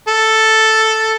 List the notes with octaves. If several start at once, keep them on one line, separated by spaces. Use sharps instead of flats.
A4